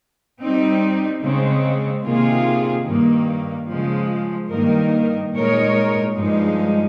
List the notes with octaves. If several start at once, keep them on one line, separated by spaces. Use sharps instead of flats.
G3 C4 D#4
C#3 G#3 C4
C3 D#3 A#3 F4 G#4
G2 D#3 A#3
C#3 F3 G#3
G2 D#3 A#3 D#4 A#4
A#2 G#3 D#4 A#4 C#5
G2 F3 G#3 D#4